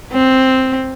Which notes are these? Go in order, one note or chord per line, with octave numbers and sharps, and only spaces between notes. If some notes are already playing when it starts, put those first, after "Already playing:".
C4